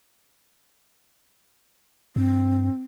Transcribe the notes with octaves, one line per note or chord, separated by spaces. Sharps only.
G2 C4